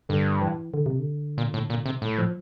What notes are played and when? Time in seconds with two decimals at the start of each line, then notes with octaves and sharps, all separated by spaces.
0.09 G2 D3
0.41 E3
0.74 D3
0.86 C3
0.99 D3
1.38 A#2
1.54 A2
1.70 A#2
1.86 C3
2.02 A2
2.18 F3